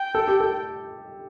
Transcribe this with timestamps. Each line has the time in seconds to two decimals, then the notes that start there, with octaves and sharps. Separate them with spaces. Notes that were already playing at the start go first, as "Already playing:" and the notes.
Already playing: G5
0.15 A4
0.28 G4
0.40 A4